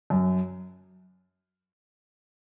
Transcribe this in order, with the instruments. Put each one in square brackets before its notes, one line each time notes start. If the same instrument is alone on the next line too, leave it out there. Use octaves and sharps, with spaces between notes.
[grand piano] F#2